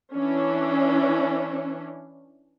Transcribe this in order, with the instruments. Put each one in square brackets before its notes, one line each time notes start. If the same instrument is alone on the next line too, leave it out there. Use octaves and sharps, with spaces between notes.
[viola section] E3 C#4 D4